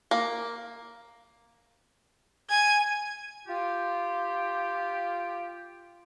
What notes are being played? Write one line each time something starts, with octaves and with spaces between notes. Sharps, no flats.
A#3
G#5 G#6
F4 G4